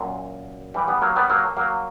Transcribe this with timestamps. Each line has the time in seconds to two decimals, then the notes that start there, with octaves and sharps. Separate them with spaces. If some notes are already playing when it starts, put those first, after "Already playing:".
Already playing: F#2 A#2
0.74 E3 G3
0.88 G3 B3
1.02 F#3 A#3
1.16 G3 B3
1.30 F#3 A#3
1.57 F#3 A#3